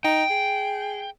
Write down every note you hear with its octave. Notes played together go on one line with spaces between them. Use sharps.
D#4 G5
G#4